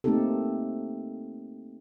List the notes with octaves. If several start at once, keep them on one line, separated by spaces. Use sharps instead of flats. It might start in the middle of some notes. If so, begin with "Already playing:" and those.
A3 A#3 C4 D#4 G4 A4